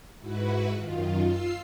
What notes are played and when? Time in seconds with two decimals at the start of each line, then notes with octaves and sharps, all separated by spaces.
0.20 G#2 E4 F#4 B4
0.76 F#2 D#3 F4
1.25 F4 E6 C7